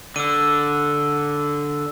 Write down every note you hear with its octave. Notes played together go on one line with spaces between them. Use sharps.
D3 E6 D#7